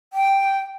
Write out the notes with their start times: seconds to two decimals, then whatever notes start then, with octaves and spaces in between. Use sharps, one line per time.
0.13 G5